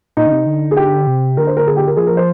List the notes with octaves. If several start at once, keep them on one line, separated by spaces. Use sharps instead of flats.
A#2 D#4
D3
C3
D3
G#4
G4
C3
D3 A#4
C5
A#4
G#4
G4
A#4
F3 G#4
A#4
C5